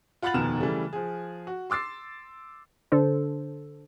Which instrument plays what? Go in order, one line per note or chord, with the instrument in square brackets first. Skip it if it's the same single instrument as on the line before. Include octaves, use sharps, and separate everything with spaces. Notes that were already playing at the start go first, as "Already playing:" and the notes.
[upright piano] F4 F#5 B5 F#6 A6 F#7
F1 D#2 B2 A#5 F6 E7
C#3 E3 G3 A3
F3 G#4
F#4
C6 D6 E6 A6 C7
[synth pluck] D3 D4 A4 C5